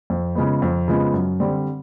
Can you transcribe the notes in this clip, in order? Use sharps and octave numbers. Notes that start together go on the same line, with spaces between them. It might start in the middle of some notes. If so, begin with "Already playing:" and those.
F2
C#3 F3 G#3 B3
F2
C#3 F3 G#3 B3
F#2
D3 G3 C4